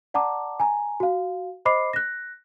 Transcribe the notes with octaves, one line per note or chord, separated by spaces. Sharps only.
D5 F#5 A5 A#5 D6
G#5 A#5
F#4 F5
C5 D#5 B5 D6 C7
F#6 A#6